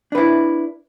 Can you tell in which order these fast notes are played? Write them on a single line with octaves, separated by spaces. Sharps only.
D4 B4 E4